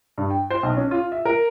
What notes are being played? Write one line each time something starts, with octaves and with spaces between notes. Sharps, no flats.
G2
G5
C5
B1
C#4
F4
E5
A#4